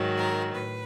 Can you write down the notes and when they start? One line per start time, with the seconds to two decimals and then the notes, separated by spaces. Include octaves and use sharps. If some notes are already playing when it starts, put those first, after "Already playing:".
Already playing: G#2 D#3 F#3
0.16 A#4
0.54 A2 B4